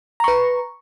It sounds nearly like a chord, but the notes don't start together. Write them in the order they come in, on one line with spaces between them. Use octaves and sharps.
A#5 C#6 B4